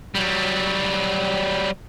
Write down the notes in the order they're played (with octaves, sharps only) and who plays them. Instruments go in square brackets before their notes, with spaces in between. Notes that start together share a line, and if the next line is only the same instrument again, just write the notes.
[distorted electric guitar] F#3 G3